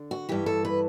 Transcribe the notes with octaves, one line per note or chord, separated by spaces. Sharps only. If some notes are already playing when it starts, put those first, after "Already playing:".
Already playing: D3
F#4
G2 E3 G4
A4
B4